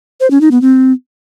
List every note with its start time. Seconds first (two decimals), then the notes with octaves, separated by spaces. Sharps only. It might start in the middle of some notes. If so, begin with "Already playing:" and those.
0.20 C5
0.31 C#4
0.41 D#4
0.51 B3
0.62 C4